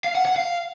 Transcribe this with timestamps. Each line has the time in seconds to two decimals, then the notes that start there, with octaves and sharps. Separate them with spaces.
0.04 F5
0.15 F#5
0.26 F#5
0.36 F5